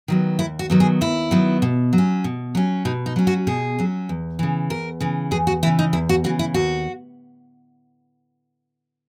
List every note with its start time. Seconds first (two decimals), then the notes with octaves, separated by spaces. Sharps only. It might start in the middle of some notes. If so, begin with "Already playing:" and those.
0.08 D#3 F#3 B3
0.39 D#2 E4
0.59 F#4
0.70 D#3 F#3 B3
0.80 G#4
1.01 D#2 E4
1.31 D#3 F#3 B3
1.62 B2
1.93 F#3
1.98 C#4
2.24 B2
2.55 F#3 C#4
2.85 B2 D#4
3.06 D#4
3.16 F#3 C#4
3.27 F#4
3.47 B2 G#4
3.79 F#3 C#4
4.09 E2
4.39 C#3 E3
4.70 E2 A#4
5.01 C#3 E3
5.31 E2 G#4
5.47 F#4
5.63 C#3 E3 E4
5.79 D#4
5.93 E2 E4
6.09 F#4
6.24 C#3 E3 F#4
6.39 E4
6.54 D#2 F#4